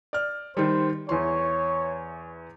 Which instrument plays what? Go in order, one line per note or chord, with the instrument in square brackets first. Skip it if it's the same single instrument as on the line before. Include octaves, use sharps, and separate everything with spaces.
[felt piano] D5 F6
[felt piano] D#3 G3 [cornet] C5
[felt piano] E2 E3 C6 [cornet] C#5